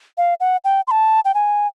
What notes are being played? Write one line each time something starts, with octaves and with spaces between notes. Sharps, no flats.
F5
F#5
G5
C6
A5
G5
G#5